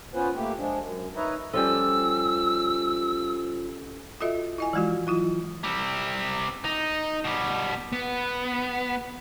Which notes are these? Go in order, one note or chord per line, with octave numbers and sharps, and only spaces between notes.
B3 C#4 F4 B4 C5
A3 A#3 G4
F3 G#3 D4
F#2
D#4 B4 C#5 D#5 E5 A#5
F3 G3 C#4 G4 A4 E6
F4 F#4 A4 D#5 E5
E4 D#5 G#5
E3 F3 G#3 F4 F#4
F#3 E4 F4
G3 C4
D#4
B2 G3
B3